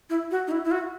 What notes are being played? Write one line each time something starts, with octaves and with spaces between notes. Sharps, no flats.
E4
F#4
D#4
E4
E4
F#4